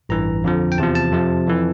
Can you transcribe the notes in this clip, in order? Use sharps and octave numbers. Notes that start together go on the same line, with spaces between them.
A1 G2 E3 A#5
F2 D3 F3
G5
E2 C3 F3 A5
A5
F2 C3 F3
F2 E3